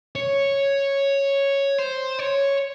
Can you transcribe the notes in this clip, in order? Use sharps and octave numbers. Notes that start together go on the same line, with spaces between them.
C#5
C5
C#5